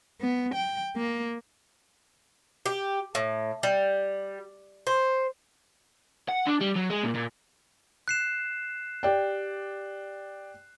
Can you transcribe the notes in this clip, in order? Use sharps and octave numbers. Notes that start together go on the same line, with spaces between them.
B3
G5
A#3
G4
A2
G3
C5
F#5
D4
G3
F#3
G#3
A#2
A#2
F#6 C7 E7
G4 D5 G5